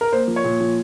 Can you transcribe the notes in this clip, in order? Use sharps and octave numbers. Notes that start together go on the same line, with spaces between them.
A#4
A#3 C5
F3
C#5
A#2
F3